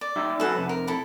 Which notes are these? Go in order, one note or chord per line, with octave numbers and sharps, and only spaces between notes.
D5
D#4 G4 E5
C#4 F#4 A4 B4 F#5 G#5
F2 C3
A#4
E4 A4 B5